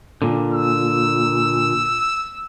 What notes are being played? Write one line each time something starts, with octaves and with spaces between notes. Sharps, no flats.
A#2 D3
E6